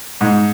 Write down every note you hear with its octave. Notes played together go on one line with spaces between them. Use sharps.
G#2